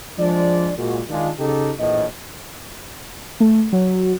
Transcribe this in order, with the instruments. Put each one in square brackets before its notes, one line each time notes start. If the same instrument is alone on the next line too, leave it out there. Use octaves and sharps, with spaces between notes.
[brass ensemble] F3 G#3 D4 D5
A#2 G#3 F#4
D#3 G#3 D4 F4
C#3 D#4 G4 A4
A#1 A2 E3 D#5
[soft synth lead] A3
F#3